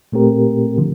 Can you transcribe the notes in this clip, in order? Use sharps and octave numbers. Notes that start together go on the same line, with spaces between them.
A#2 A3 C4 G4 A#4
D3 F3